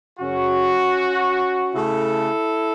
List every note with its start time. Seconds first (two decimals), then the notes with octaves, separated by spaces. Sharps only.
0.19 F#2 C#3 F#3 C#4 F#4
1.74 C#3 A3 E4 A4